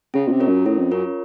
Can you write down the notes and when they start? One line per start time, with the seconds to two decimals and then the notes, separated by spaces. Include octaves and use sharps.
0.14 C#3 C#4
0.27 A#2
0.32 C3
0.40 F4 A#4 C#5
0.48 F#2
0.66 A2 C#4
0.78 F2
0.91 F#2 F4 A#4 C#5